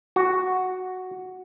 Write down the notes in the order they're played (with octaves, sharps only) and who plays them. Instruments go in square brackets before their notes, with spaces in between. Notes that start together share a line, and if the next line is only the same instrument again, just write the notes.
[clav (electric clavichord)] F#4